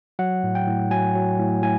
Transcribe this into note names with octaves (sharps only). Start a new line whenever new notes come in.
F#3 F#5
A2
G5
A2
F#3 G#5
F#3
A2
A2 G#5